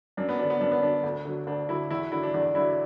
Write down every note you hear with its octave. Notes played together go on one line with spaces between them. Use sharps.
F#2 D4
B3
D3 F#3 D4
B3
F#2 D4
B3
D3 F#3 D4
D2
D3 F#3
D2 D4
D3 F#3 E4
E2 E4
D3 F#3 E4
D4
E2 D4
D3 F#3 E4